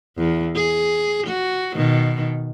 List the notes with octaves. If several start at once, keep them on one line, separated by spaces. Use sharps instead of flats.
E2
G#4
F#4
B2 D#3